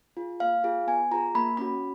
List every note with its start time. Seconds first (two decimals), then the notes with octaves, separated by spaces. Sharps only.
0.17 F4 G#4
0.40 A#3 F5
0.64 F4 G#4
0.87 B3 G#5
1.11 F4 G#4 A#5
1.35 A#3 B5
1.57 C#4 F#4 B5